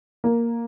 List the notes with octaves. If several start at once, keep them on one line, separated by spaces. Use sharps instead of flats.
A#3